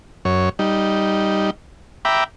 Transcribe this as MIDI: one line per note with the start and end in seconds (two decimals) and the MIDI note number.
0.25 0.49 42
0.25 0.49 73
0.59 1.50 55
0.59 1.50 63
2.05 2.24 76
2.05 2.24 79
2.05 2.24 82
2.05 2.24 83
2.05 2.24 86